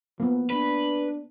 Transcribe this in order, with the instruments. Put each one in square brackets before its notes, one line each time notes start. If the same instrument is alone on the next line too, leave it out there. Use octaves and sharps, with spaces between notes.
[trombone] F3 [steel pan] A#3 B3
[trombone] D4 [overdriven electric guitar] B4